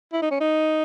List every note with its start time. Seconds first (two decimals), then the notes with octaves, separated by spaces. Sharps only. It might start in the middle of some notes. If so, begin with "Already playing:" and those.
0.13 E4
0.22 D#4
0.31 C#4
0.41 D#4